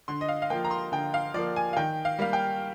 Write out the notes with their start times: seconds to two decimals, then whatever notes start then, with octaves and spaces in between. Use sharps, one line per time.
0.08 D3 C6
0.21 D#5
0.28 F5
0.42 F5
0.50 F3 A#3 G5
0.65 A#5
0.71 C6
0.92 D3 G5
1.14 F5
1.34 F3 A#3 D5
1.56 G#5
1.73 F5
1.77 D#3 G5
2.05 F5
2.19 G3 A#3 F5
2.33 G5